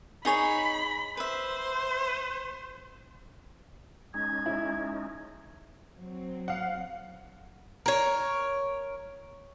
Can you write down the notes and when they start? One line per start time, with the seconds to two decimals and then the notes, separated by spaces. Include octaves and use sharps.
0.25 D#4 G#4 C#5 B5
1.17 B4 C5 E5
4.14 G#3 C#4 D#4 G#6
4.46 E4
5.96 F#3 C4
6.48 F5 F#5
7.86 A#4 C#5